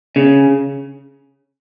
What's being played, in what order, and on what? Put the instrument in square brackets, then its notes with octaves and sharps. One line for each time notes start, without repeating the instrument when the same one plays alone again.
[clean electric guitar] C#3